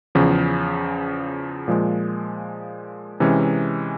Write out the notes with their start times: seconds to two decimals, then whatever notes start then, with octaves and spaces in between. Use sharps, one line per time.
0.15 E2 C#3 F3
1.68 A#2 F3 G#3
3.20 C3 E3 G#3 C#4